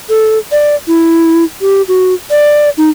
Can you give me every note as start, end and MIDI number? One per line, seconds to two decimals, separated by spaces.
0.09 0.39 69
0.52 0.75 74
0.88 1.44 64
1.61 1.82 67
1.88 2.14 66
2.30 2.70 74
2.78 2.90 63